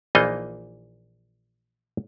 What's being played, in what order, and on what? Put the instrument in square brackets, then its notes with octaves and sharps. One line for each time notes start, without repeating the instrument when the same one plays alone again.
[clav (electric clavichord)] A#1 E3 A#3 D#4 F4 D#5